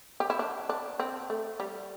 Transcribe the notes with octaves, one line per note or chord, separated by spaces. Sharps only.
G4
E4
D4
D4
C4
A3
G3